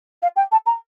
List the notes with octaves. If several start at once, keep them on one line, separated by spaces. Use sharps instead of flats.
F5
G5
A5
A#5